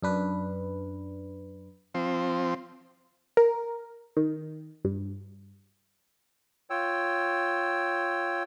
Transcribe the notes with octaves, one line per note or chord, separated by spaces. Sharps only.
F#2 D4 B4
F3 C4
A#4
D#3
G2
F4 C#5 G5 E6